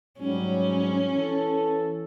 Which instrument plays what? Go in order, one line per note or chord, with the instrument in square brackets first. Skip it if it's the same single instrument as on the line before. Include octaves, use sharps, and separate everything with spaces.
[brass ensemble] G#2 F#3 G3 [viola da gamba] C#4
[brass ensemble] E3 A4